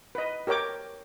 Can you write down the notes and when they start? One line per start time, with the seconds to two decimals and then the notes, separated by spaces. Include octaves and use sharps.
0.15 B4 D#5
0.47 G4 A#4 C#5 G5 D6